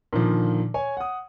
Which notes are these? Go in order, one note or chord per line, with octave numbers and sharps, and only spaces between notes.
A#2 D3 D#3 F3
C#5 G#5
F#5 D#6